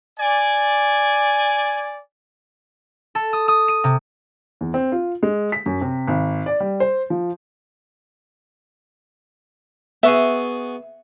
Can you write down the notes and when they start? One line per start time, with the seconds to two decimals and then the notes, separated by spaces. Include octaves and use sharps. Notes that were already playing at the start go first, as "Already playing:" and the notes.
0.19 D5 G#5
3.15 A4
3.33 D#6
3.48 D#6
3.68 D#7
3.84 C3
4.61 E2
4.74 C4
4.92 F4
5.23 G#3
5.52 B6
5.66 F#2
5.81 C3
6.08 G#1
6.46 D5
6.60 G3
6.80 C5
7.10 F3
10.03 B3 F#4 G#4 E5